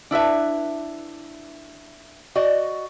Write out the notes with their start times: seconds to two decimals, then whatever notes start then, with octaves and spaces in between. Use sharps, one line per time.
0.11 D4 E4 B4 E5
2.35 F#4 D5 D#5